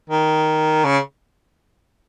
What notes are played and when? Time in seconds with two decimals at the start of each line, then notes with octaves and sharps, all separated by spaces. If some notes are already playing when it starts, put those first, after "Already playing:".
0.10 D#3
0.84 C#3